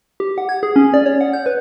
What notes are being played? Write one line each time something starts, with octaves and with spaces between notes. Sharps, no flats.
G4
F#5
G#6
G#4
C#4
D5
C#5
F#5
G6
B4